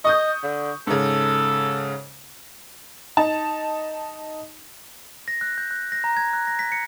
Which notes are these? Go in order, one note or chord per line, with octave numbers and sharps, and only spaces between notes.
D#5 C#6 D#6 G6
D3
G#2 C#3 A4
D#4 A5
A#6
F#6
G6
F#6
A#6
A#5
G#6
F#6
A#6
B6
C#7